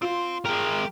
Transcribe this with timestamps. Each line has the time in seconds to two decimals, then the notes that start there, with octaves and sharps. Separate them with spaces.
0.02 C4 F4 C5
0.45 G#3 G4 A#4